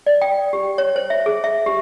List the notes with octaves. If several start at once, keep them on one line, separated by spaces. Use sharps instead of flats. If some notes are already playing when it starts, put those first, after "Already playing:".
D5
G5
G4
C#5
C5
E5
G#4
E5
G4